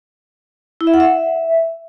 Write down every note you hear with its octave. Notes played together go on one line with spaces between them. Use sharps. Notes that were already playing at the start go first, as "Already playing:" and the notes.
E4
E5
F#5
E5